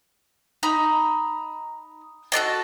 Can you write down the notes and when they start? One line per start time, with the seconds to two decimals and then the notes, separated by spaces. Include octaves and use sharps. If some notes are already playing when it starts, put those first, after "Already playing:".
0.63 D#4 A#5 B5
2.32 F#4 A4 D5 D#5